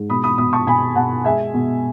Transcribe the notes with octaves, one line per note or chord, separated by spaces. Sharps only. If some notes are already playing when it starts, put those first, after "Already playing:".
Already playing: G#2
B2 B5 D#6
B5 D#6
B2 B5 D#6
A5 C#6
B2 G#5 B5
B2 F#5 A5
G#3 E5 G#5
B2